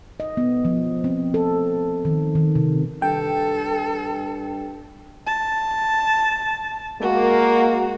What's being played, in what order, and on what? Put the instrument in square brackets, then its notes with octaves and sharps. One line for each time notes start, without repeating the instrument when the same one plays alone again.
[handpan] D#5
B3
F3
C4
A4
D#3
D#3
C3
[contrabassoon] G2 [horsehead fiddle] A4 [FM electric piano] G5
[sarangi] A5
[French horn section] G#3 A#3 [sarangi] F#4